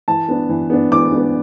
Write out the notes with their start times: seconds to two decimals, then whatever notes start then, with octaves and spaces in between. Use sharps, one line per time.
0.08 E3 A5
0.28 B3 D4
0.49 E3
0.70 B3 D4
0.91 E3 D6
1.12 B3 D4